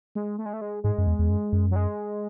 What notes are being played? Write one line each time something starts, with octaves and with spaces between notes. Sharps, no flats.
G#3
A3
G#3
A3
G#3
G#2 G#3
F#2
E2
E2
F#2
F#2
F#3
G#3